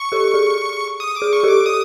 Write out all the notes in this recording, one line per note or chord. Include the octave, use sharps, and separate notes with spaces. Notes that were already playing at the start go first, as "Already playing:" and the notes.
Already playing: C#6
G4 A4
G#4
D#6
D6
G#4
C#6
G4 A4
D6
D#6